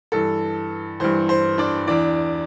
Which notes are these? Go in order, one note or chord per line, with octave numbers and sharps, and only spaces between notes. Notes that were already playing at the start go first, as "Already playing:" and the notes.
G2 E3 A4
G2 E3 C5
C5
D4 D5
E2 E3 D4 D5